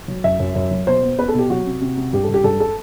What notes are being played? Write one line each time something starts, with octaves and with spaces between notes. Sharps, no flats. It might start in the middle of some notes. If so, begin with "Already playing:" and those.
F#3
F#2 E5
F#2
F#2
F#3
B2 C5
B3
B3 B4
A4
B2 G4
F#3 F#4
C3
C3
C3
G2 G4
A4
G2 G4
G2 A4
A4